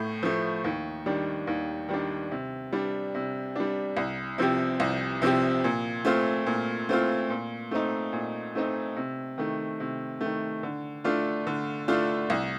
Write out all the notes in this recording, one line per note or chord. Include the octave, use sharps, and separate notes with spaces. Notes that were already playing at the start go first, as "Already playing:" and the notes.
Already playing: A2 A3
F3 A3
D#2
D#3 G3 D4
D#2
D#3 G3 D4
C3
G3 D4
C3
G3 D4
C2
C3 F3 C4 G4
C2
C3 F3 C4 G4
A#2
A3 C4 F4
A#2
A3 C4 F4
A#2
A3 C4 D#4
A#2
A3 C4 D#4
C3
D#3 A3
C3
A3
D#3
D3
A3 D4 F4
D3
A3 D4 F4
C2